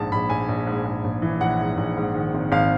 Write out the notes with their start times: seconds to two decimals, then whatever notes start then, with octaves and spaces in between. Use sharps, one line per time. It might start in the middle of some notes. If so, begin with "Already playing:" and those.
Already playing: A#1 G#2 A5
0.12 A#1 B5
0.30 A#1 G#5
0.49 A#1
0.67 G#2
0.85 G#2
1.04 A#1
1.22 E3
1.41 A#1 F#5
1.60 G#2
1.77 A#1
1.97 G#2
2.14 D#3
2.34 G#1
2.52 G#1 F5